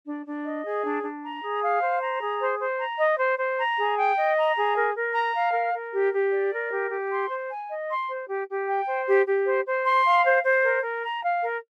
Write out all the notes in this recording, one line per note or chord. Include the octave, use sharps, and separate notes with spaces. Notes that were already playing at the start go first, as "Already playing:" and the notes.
D4
D4
D#5
G#4
D4
D4
A#5
G#4
F5
C5
A#5
G#4
C5
C5
A#5
D#5
C5
C5
A#5
G#4
G5
D#5
A#5
G#4
A#4
A#4
A#5
F5
A#4
A#4
G4
G4
D5
A#4
G4
G4
C6
C5
G#5
D#5
C6
C5
G4
G4
G5
C5
G4
G4
C5
C5
C6
F5
C5
C5
A#4
A#4
A#5
F5
A#4